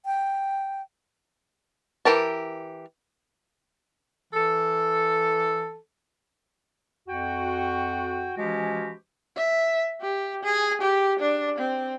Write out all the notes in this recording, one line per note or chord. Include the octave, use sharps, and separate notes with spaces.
G5
E3 G4 A#4 A5
E3 A4
F2 F#4 G5
E3 F3 G#3 C#4 F#4 G4
E5
G4
G#4
G4
D4
C4